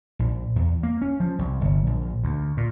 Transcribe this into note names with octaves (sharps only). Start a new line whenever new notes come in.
A#1
E2
A#3
C#4
F3
C2
G1
A#1
D2
A#2